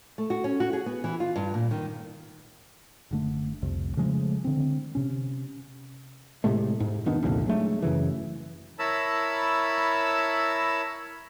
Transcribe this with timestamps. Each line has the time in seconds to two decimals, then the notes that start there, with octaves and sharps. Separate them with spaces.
0.18 A3
0.30 F#4
0.44 C#4
0.60 F#4
0.73 G#4
0.86 B3
1.04 E3
1.20 F4
1.36 G2
1.54 A#2
1.71 D#3
3.11 F#1 D3 A3
3.63 C2 F2 C3
3.97 C#3 F3 G#3 A3
4.44 D3 C4
4.95 C3 C#4
6.44 A2 C3 G#3 A3
6.80 G#2
7.06 F1 D#3 B3 D4
7.22 C2 F2 A#2 D3
7.47 F#3 G#3 A3 D4
7.82 F#2 C#3 E3
8.79 E4 A#4 C#5 A5 B5 E6